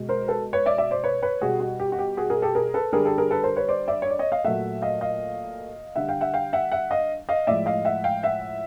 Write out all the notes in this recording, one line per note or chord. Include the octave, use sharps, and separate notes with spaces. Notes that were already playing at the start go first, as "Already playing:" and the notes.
Already playing: B2 G#3
A#4 C5
A4 B4
B4 C#5
D5 E5
D5 E5
C5 D5
B4 C#5
B4 C#5
B2 G3 F#4 G#4
F#4
G4
F#4
G4
F#4 G#4
G#4 A#4
G4 A4
G#4 A#4
A4 B4
D3 G3 G#4 A#4
G4 A4
G#4 A#4
A4 B4
A#4 C5
B4 C#5
C5 D5
D5 E5
C#5
D5
C#5 D#5
D#5 F5
A#2 F#3 A3 E5 F#5
D#5 F5
D#5 F5
D3 G3 E5 F#5
F5 G5
E5 F#5
F5 G5
E5 F#5
E5 F#5
D#5 F5
D#5 F5
A2 F3 G#3 D5 E5
D#5 F5
E5 F#5
F5 G5
E5 F#5